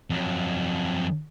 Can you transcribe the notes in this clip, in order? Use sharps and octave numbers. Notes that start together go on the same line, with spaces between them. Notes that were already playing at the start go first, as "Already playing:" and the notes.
F2 F#3